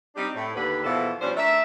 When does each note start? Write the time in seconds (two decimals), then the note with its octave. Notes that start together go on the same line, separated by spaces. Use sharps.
0.16 G3 C4 D4 D#4 G4
0.35 A2
0.55 D#2 D3 B4
0.84 E2 B2 E3 F3 A4
1.21 B2 F3 G3 C#4 D4 C5
1.36 A3 D4 A4 A#4 E5